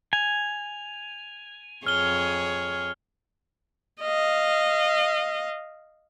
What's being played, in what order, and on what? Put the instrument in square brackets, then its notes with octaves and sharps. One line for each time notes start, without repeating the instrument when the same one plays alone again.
[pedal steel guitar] G#5 [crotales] F7
[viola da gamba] F2 G#4 C#5 [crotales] F6 G7
[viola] D#5 F5